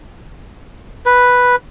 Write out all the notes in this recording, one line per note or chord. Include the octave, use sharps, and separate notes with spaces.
B4